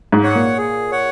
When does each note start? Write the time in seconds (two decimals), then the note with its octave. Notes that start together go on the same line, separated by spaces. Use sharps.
0.12 G#2
0.23 C#5 F#5
0.35 A#2
0.57 G#4
0.91 C#5 F#5